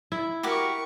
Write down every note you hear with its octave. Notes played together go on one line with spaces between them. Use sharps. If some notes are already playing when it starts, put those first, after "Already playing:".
E4
F#4 G4 A#4 C#6 D6